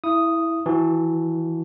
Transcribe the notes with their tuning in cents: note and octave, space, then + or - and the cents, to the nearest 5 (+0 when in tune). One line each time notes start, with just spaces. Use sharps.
E4 -10 E5 +45 D#6 +0
E3 +0 F#4 +0 A5 +0